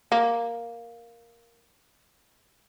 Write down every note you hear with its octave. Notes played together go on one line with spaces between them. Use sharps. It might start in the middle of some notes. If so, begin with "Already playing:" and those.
A#3